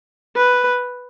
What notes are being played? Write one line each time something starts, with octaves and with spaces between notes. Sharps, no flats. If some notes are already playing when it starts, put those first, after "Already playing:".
B4